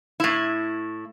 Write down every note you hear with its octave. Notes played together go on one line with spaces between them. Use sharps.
A2 E4